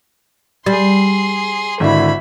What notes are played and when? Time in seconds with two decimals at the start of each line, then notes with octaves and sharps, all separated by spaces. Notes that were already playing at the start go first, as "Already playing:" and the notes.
0.66 G3 G#4 C6
1.80 G#1 D3 E4 E5 B5